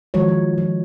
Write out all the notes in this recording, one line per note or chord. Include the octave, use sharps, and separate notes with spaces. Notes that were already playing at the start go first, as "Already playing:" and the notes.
D#3 F3 G#3 F#4 C#5
F3
F3